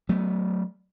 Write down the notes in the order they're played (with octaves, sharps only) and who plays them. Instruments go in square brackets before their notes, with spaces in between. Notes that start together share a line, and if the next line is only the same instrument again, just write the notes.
[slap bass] F#3 A3 B3